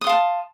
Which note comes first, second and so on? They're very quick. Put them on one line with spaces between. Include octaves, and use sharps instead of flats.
D#6 C6 F5 A5